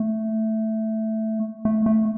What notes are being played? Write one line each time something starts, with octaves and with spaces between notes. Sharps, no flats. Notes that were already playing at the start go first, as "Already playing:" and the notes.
Already playing: A3
A3
A3